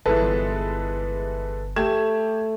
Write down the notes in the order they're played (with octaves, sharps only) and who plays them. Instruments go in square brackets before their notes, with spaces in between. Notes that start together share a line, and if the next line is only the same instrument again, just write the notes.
[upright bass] G1 [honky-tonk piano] E3 G#3 [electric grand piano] A4 B4 A5
[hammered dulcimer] A3 [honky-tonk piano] G4 G#6 E7